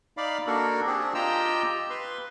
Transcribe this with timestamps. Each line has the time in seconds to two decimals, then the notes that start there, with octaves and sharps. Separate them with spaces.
0.17 D#4 D5 F5 B5
0.47 A#3 D4 F#4 A4 A#4
0.86 C4 D4 G4 G#4
1.14 F4 G4 D#5 G5 A#5 E6
1.90 B4 C6